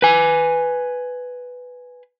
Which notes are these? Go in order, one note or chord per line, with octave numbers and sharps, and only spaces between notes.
B4 G#5